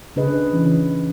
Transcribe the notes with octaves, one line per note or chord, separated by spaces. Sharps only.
C#3 D4 G#4 B4 D#5
E3 C#4